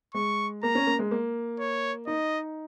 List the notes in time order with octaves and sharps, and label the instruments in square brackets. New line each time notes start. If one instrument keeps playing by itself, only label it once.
[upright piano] G#3 [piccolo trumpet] C#6
[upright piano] A#3 [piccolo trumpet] A#5
[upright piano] C#4
A#3
G#3
A#3
[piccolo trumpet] C#5
[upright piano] D#4 [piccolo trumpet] D#5